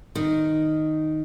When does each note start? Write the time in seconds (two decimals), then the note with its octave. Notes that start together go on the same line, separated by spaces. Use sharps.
0.15 D#3